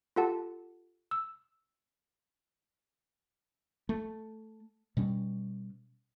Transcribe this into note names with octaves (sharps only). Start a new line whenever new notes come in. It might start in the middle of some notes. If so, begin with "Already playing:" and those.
F4 G4 A4 F#5 A5
E6
A3
B2 G3 C#4